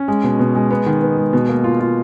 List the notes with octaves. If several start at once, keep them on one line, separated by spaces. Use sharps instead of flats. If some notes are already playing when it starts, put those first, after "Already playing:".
Already playing: C#4
G#3
B2
B2
G#3
B3
D#3
B3
G#3
B2
A#3
F4
F4